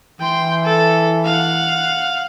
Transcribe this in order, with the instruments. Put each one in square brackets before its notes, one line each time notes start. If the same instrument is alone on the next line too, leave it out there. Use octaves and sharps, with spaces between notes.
[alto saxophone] E3 [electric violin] G5 C6
[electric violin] A4
F5 F#5